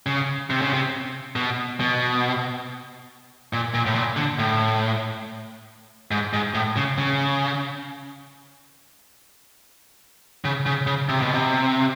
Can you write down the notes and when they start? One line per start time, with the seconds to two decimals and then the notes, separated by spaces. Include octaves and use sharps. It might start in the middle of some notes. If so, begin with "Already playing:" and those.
0.06 C#3
0.50 C3
0.62 C#3
0.73 C3
1.36 B2
1.80 B2
3.53 A#2
3.74 A#2
3.86 A2
3.95 A#2
4.17 D3
4.39 A2
6.11 G#2
6.33 G#2
6.54 A2
6.76 C#3
6.98 C#3
10.45 C#3
10.66 C#3
10.87 C#3
11.09 C3
11.21 B2
11.34 C3